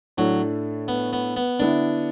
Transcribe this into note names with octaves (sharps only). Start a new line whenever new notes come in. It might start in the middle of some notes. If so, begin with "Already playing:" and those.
A2 F#3 A3 D4
B3
B3
B3
D3 B3 D4 E4